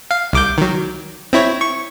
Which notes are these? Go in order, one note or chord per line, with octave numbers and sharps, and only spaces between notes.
F5
C2 D6 G6
D#3 F#3
C4 E4 C#5
C#6